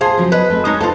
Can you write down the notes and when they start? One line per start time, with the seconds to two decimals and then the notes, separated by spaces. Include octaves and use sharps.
0.01 A#2 G#4 C5 F5
0.17 C#3 F3 F#3
0.32 B3 B4 D#5
0.50 A3 C4 G#4
0.65 A#2 G#3 D#4 C#5 A5
0.81 F4 A4 B4 C5 F5